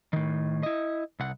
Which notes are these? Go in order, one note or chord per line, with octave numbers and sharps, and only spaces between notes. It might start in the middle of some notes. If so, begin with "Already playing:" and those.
A2 D#3
E4 D#5
C2 F#5